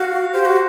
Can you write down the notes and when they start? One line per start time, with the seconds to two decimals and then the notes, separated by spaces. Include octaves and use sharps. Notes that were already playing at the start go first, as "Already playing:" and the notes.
Already playing: F#4 F5
0.34 G4 C5
0.45 F#4